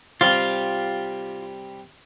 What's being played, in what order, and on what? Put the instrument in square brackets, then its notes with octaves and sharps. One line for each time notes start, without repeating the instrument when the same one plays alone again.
[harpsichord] C3 G3 [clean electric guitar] F4